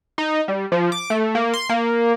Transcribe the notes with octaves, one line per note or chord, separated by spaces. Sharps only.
D#4
G3
F3
D6
A3
A#3
C6
A#3